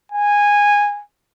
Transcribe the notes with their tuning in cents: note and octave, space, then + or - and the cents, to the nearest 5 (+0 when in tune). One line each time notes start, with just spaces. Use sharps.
G#5 -15